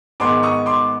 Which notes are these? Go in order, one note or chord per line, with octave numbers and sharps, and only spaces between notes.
G#2 D#3 G#3 B3 C6 D6
C#6 D#6
C6 D6